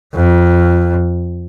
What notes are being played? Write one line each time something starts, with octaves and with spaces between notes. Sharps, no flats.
F2